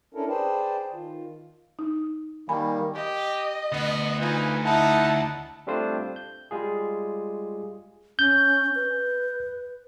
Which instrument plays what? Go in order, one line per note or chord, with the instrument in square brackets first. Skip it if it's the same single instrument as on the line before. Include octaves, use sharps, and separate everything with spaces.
[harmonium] C#4 D4 E4 A4 A#4
G#4 B4 C5 D5 G5 A5
D#3 F4
[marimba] D#4
[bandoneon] D#3 G3 A#3 [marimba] G#5 B5
[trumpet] G4 [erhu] D#5
[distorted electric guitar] D2 [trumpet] B3
[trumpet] D#4 [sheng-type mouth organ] F4 B4 [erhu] G#5
[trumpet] D#4 [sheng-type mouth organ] E4 F#5 [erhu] A5
[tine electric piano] G3 A3 C4 D4 F4 C5
G6
G3 G#3 F4 G#4
[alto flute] C#4 [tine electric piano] G6
[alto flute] B4